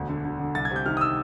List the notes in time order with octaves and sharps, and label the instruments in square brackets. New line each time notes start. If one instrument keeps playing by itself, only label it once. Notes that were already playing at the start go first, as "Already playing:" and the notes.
Already playing: [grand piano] E1 D2
D3
D3
D3
C2 A6
G#6
C3
G6
D#3 F6
D#6
E6